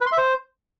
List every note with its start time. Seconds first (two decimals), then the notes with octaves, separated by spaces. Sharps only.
0.01 B4
0.06 C6
0.12 E5
0.18 C5